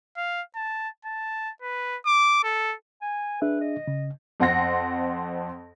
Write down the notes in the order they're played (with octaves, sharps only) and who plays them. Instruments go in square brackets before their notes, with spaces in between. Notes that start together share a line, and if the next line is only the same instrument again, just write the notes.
[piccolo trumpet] F5
A5
A5
B4
D6
A4
[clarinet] G#5
[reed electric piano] D4 G#4 E5 [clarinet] B4
[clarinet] D#5
[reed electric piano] C#3
[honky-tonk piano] F2 C4 F#5 C6 A#6